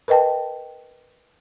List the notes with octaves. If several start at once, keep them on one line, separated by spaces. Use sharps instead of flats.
A#4 B4 D#5 G5 A5